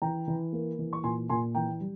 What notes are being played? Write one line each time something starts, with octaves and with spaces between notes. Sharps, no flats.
E3 G5 A#5
E3
A#3
E3
C#6
A#2 G#5 C6
A#2 G#5 C6
E3 G5 A#5
G3